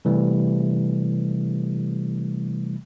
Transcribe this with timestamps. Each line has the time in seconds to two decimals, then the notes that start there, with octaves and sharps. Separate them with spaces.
0.05 C3 E3 G3 A3